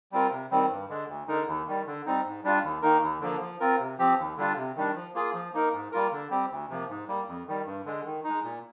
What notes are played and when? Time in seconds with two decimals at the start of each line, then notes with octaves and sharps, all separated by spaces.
0.12 G3 C4 F4 A#4
0.31 C3
0.51 D#3 G3 C4
0.70 G2
0.89 D3 G#3
1.08 D2
1.28 D3 G#3 D#4 A#4
1.47 D#2
1.67 D#3 G3
1.86 D3
2.06 G3 C4 D#4
2.25 G#2
2.44 G3 D4 F4
2.63 D#2
2.82 D#3 A#3 D#4 A#4
3.02 D#2
3.21 D3 F3 A#3
3.41 F3
3.60 C4 F4 A#4
3.80 C3
3.99 F3 C4 G4
4.18 D#2
4.37 D3 G3 D4 F4
4.56 C3
4.76 D#3 G3 D4
4.95 F3
5.14 A#3 F4 G#4
5.34 F3
5.53 A#3 D#4 A#4
5.73 G#2
5.92 G3 A#3 F4 A#4
6.12 D3
6.30 G3 C4 G4
6.51 D2
6.69 C3 F3 A#3
6.89 G#2
7.08 G3 A#3
7.28 F2
7.47 D#3 G3
7.66 G2
7.86 D3 G#3
8.05 D#3
8.24 G#3 D#4
8.43 A#2